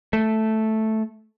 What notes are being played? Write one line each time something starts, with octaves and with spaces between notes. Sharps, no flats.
A3